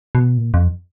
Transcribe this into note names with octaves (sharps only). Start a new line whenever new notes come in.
B2
A#2
F2